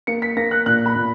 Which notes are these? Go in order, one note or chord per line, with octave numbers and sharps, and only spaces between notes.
A#3 C#7
B6
A#3 A#6
F#6
A#2 F#6
B5
A#2